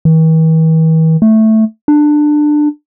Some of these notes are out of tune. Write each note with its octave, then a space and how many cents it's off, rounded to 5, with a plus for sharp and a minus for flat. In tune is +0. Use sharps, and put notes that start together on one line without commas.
E3 -45
A3 +0
D4 +20